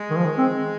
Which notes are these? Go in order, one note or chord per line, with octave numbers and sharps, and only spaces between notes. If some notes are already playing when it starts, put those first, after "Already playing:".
Already playing: G#3
D#3
F3
D#3
C4